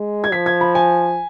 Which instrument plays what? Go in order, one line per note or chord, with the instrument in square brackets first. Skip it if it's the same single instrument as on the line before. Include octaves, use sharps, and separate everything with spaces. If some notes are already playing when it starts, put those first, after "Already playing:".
Already playing: [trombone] G#3
[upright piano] G#6
[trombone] F3 [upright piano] B6
[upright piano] G#6
B5
G#5